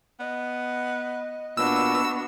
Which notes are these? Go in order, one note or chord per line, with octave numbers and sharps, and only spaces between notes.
B3 D#5
A#2 B3 D4 F#4 E6